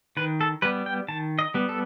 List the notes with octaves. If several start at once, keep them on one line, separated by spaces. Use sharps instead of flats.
D#3 B4
A4
G3 B3 B4
G5
D#3 A5
D#5
G3 B3
A4